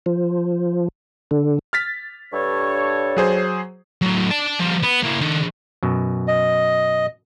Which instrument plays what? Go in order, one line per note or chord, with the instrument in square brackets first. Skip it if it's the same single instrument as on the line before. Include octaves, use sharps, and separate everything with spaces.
[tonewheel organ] F3
D3
[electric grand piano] F6 A6 B6
[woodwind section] G2 A4 C#5
[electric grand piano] F#3 G#4 C5
[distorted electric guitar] A2 F#3
D5 A5
F3 G3
B3
A#3 E4
D#3 D4
[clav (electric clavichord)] F#2 B2
[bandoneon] D#5